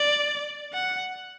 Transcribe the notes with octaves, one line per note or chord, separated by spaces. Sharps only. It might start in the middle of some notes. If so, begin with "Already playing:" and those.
Already playing: D5
F#5